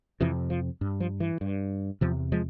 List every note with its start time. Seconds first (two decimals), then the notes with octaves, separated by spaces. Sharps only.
0.20 F2 C3 E3
0.50 F3
0.81 G2
1.00 F3
1.20 E3
1.41 G2
2.01 E2 C3 F3
2.32 F3 G#3